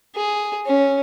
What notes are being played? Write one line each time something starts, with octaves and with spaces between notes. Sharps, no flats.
G#4
C#4